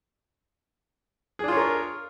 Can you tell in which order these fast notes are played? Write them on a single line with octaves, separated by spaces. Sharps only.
G#4 D4 F4 C#5 A#4